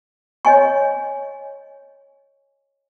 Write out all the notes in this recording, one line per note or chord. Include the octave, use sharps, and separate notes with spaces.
C#5 D#5 G#5 C#6